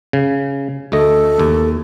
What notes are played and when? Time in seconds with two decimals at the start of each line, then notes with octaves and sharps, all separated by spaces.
0.13 C#3
0.92 D2 A3 A4 D#5
1.39 D#2